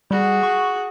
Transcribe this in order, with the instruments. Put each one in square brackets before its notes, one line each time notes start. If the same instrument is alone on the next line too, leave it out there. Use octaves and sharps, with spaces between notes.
[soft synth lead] G3 [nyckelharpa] F#4 G#4
[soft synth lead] C#6